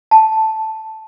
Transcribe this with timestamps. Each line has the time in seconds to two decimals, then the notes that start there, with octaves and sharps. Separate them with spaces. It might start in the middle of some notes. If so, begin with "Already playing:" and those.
0.11 A5